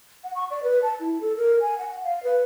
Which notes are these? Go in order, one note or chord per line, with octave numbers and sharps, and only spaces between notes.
F#5
C#6
D5
B4
A5
E4
A4
A#4
G#5
F#5
F5
B4